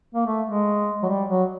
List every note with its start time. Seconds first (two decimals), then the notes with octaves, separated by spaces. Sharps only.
0.15 A#3
0.26 A3
0.47 G#3
1.03 F#3
1.09 G3
1.29 F#3